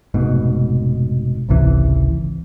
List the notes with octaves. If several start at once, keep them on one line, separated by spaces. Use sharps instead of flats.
F1 G#2 B2
G#1 C#2 C3 E3